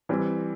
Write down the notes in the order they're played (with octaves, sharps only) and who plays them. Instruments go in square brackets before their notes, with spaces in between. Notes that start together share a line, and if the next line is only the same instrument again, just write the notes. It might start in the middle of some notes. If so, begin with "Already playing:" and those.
[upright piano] E3 G3 C4